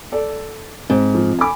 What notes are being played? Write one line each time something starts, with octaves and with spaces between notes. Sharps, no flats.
A4 D5
G#2 C4
F3
G#5 B5 D6